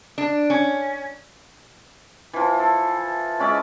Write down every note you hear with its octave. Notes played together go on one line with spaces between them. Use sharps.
D4
C#4
E3 F3
A4
G#3 C#4 D5 E5